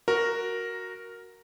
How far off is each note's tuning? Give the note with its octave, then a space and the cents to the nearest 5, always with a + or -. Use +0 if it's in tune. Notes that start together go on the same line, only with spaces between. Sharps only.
F#4 +0 A#4 +0